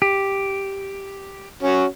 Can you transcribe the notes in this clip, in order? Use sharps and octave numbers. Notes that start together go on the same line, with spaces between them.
G4
C#4 F#4